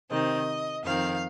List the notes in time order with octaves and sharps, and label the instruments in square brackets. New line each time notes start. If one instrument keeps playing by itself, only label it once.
[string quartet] C3 D#3 C4 D#5
F2 D#3 C4 F5